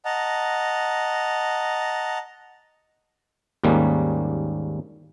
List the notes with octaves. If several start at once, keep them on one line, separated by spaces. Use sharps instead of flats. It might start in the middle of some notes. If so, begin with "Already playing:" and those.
D#5 F#5 A5 A#5
D#2 G#2 G3 A#3 C#4